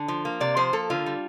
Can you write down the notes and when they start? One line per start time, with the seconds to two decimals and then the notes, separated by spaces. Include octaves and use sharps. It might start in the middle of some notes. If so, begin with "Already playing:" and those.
Already playing: D3
0.08 F3
0.25 A#3
0.40 C3 D5
0.57 F3 C5
0.73 A#3 A4
0.90 D3 F4
1.06 G3